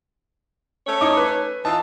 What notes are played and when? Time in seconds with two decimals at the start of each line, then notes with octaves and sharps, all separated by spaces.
0.87 A3 C#4 C#5
1.01 D#4 D6
1.17 B4
1.65 E3 D#4 F4 A5